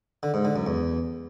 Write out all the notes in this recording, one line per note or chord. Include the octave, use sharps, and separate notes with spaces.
D3
G#2
D3
F#2
E2